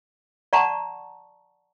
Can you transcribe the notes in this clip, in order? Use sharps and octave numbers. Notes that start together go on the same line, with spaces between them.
D5 F#5 A5 A#5 C#6